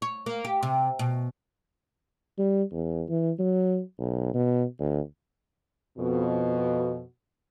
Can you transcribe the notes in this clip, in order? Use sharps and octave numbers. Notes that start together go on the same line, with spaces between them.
C#5
A#3
G4
C3
B2
G3
E2
E3
F#3
B1
B2
D2
F2 B2